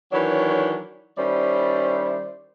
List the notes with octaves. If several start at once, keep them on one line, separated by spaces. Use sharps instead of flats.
D#3 E3 F#3 D4 C#5
D#3 G3 C#4 E4 C5 D5